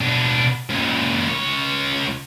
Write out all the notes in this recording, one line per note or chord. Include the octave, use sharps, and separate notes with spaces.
B2 D4
C#2 A#2
C#2 C#5